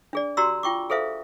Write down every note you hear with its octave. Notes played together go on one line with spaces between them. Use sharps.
D4 G#4 D5
F#4 G4 D5 A#5 C6 E6
F4 G5 C#6 D6
G#4 A4 C5 E5 F5